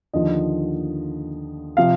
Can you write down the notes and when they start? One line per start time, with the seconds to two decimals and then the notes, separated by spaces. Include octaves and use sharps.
0.13 D#2 D3 F3 D#5
1.77 C3 F3 F5